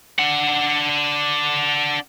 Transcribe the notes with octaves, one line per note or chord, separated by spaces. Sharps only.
D4 F#5